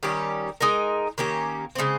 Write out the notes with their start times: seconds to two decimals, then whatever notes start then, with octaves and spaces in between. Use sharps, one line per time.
0.03 D#3 G3 C#4 G4
0.60 G#3 D#4 A#4 D#5
1.18 D#3 A#3 C#4 G4
1.75 C#3 G#3 C4